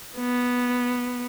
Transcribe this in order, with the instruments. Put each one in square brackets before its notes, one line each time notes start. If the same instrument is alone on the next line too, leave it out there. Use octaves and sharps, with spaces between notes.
[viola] B3